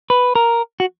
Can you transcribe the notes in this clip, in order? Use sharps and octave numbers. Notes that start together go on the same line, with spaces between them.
B4
A#4
F#4